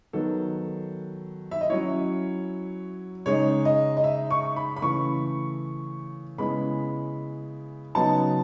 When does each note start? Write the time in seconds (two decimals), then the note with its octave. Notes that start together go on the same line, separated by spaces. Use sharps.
0.13 D#3 F#3 B3 A4
1.51 E5
1.61 D#5
1.69 F#3 C#4 E4 C#5
3.26 C#3 G#3 D#4 C#5
3.65 D#5
3.97 D#5
4.04 E5
4.31 C#6
4.56 B5
4.77 B5
4.82 C#3 E3 A3 C#6
6.38 C#3 G#3 B3 E4 B5
7.95 C#3 F#3 B3 D#4 A5